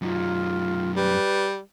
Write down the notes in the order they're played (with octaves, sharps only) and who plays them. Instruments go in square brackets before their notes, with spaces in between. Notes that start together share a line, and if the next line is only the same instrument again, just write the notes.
[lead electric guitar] F#2 D#4 [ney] F4
[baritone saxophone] G3 [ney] B4